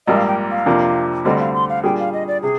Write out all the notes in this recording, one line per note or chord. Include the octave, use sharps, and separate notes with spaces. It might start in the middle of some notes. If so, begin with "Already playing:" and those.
A#1 G#2 G3 A#3 D#5
F5
G5
F5
F2 C3 F3 A#3 D4
D2 D3 G3 C4 D#5
F5
C6
F5
A#2 G3 D4 G#4 G5
F5
D#5
D5
C3 G#4